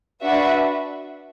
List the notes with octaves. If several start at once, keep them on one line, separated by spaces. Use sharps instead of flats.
D4 F#4 B4 E5